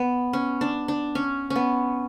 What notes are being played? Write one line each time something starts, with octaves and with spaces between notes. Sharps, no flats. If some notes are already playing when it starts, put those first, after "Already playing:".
Already playing: B3
C#4
D4
D4
C#4
C#4
B3